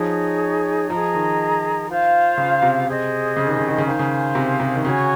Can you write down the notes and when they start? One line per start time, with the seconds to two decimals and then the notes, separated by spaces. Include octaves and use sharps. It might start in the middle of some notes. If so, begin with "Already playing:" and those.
Already playing: F3 D#4 G#4 C#5
0.90 F3 G#4 D#5 A#5
1.15 D#3
1.89 F4 C5 F5
2.38 C#3
2.63 C3
2.87 G#4 C5 D#5
3.37 C#3
3.47 D#3
3.58 C#3
3.68 D#3
3.78 C#3
3.86 D#3 C5 F5 G#5 C6
3.99 C#3
4.35 C3
4.60 C3
4.75 D#3
4.84 C#3 F#4 C#5 G#5 C#6